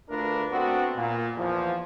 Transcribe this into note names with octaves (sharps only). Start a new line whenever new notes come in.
D2 A3 D4 F4 A#4 B4
A3 B3 C4 D4 F#4
A#2
E2 F3